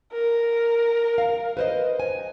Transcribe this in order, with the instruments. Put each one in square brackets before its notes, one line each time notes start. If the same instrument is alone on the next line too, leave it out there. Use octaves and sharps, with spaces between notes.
[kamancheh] A#4
[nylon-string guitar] F5
B4 C5 D#5
G#5